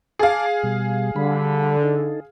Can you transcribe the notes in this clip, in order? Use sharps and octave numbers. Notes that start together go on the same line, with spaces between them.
G#4 F5 A5 D6
B2 G3
D3 G3 B5
D#4 A4